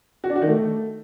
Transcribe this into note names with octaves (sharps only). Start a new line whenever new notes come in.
F#4
D4
F#4
D#3
A3